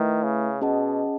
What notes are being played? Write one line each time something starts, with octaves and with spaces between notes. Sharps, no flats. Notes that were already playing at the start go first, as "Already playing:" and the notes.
Already playing: D#3 A3 E4 B4 E5
C#3
B2 C#4 G#4 D#5 F#5 A5